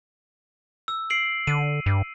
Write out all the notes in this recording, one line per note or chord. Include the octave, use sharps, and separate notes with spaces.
E6
C7 D7 F#7
D3 D#7
G2